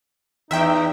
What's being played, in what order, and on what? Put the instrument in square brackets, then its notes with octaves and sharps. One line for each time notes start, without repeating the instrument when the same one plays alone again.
[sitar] E2 [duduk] D#4 [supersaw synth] E5 G5